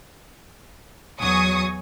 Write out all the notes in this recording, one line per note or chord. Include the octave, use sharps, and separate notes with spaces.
E2 F#3 G#5 C#6 D#6